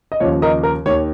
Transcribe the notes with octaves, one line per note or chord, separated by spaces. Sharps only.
D#5
D#2 C#3 F3 C#5
A#4 D#5
A#4
D#2 D#3 C#5